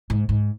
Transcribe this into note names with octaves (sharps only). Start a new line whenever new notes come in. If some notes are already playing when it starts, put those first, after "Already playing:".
G#2
G#2